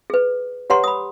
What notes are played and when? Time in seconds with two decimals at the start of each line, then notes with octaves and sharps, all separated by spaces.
0.10 G#4 B4
0.70 G4 B4 C#5 F#5 A#5 C6
0.84 B5 D#6